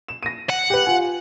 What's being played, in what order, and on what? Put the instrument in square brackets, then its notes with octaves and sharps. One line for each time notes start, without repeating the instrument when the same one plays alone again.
[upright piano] E7
A#6 D#7
[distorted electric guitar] F#5
[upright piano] G4 B4
F4 G#5